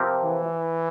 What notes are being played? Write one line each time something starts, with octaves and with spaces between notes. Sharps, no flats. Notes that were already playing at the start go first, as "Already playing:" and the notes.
Already playing: C3 F3 C4 G4 A#4
E3